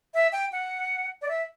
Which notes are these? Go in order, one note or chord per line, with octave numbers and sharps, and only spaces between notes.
E5
G5
F#5
D5
E5